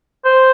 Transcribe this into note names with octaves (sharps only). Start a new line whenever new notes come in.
C5